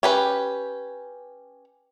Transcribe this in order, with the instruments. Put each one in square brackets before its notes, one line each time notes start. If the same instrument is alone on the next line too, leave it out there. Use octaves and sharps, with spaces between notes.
[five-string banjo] C#4 G4 B4